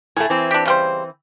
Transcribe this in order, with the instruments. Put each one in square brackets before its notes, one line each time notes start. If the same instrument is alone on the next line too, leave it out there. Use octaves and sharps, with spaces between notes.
[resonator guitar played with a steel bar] A2 A3 [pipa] G#4
[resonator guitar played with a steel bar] E3 C4
[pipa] D4 G4
C#3 G3 C5